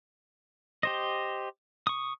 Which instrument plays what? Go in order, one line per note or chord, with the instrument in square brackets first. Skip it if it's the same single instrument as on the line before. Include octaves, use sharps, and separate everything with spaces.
[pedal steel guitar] G4 C5 D#5
C#6 D#6